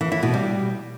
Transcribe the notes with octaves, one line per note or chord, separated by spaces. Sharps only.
E3
E4
B2
G3